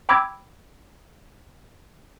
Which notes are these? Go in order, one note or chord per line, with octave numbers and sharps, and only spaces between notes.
G5 B5 D6 E6 G#6